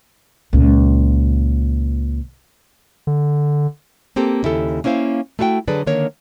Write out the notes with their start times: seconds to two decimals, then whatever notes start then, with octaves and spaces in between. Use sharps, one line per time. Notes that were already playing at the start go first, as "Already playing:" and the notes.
0.53 C#2 A#2
3.07 D3
4.16 A#3 C4 G4 A4
4.43 D#2 C#3 E4 G4 A4
4.84 A#3 C#4 E4 C5 F5
5.39 A3 E4 F#4 F5 G5
5.68 D3 F#3 G#4 A4 B4 D5
5.87 D3 D#3 A#3 A#4 C#5